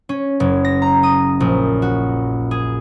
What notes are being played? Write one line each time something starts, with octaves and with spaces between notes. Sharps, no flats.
C#4
F#1
A#6
A#5
D#6
A#1
F#4
G#4